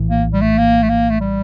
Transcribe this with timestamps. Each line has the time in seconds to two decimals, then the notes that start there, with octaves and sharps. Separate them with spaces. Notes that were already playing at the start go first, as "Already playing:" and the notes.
Already playing: A#1 A2 E3
0.10 A#3
0.34 G3
0.41 A3
0.58 A#3
0.83 A3
0.90 A#3
1.10 A3
1.21 G3